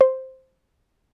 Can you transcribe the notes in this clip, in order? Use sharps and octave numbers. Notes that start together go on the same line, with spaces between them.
C5